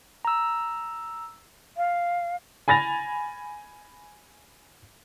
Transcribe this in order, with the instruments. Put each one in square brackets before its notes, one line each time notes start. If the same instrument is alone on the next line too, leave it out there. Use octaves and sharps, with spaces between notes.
[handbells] A#5 E6
[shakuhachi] F5
[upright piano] G#5 B5 A6 A#6 F7